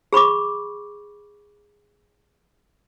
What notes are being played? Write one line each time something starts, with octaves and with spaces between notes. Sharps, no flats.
G#4 B5 C#6 D6